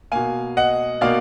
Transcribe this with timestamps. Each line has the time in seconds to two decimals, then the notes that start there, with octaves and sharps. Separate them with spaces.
0.12 B2 A#3 F5 G#5
0.57 D#5 F#5
1.01 B2 A#3 D5 F5